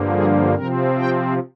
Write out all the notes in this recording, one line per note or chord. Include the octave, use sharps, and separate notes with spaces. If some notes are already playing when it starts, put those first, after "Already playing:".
Already playing: G2 D3 F3 A#3
G#4
C3 F3 C4 A#4
G5